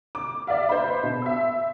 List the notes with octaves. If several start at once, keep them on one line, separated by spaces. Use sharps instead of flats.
D6
D5 E5 F5
B4 C5 D#5 B5
B2
E5 E6